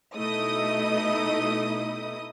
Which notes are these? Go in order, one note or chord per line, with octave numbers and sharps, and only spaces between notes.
B2 A3 D#4 E4 D#5 D#6